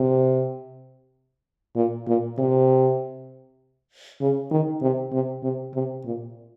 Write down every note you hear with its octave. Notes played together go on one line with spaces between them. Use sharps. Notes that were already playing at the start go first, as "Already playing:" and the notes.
Already playing: C3
A#2
A#2
C3
C#3
D#3
C3
C3
C3
C3
A#2